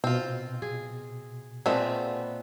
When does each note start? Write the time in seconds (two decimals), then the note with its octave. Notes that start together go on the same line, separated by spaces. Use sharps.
0.04 B2 C4 F4
0.62 G#4
1.66 A#2 G#3 A3 B3 C4 E5